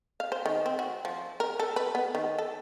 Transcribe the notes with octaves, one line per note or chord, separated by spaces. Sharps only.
F5
C5
D#3
C4
F#4
F3
A#4
A4
B4
B3
D#3
A4